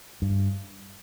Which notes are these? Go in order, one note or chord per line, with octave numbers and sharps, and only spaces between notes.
G2